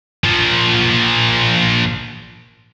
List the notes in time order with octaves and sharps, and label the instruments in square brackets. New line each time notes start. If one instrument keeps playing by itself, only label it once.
[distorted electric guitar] A#2 F3